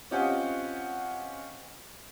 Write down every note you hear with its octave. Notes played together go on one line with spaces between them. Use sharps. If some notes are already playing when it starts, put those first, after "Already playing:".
C4 C#4 F4 G4 D#5 F#5